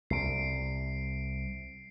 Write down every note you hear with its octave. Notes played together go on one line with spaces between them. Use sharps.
C2 C7 D7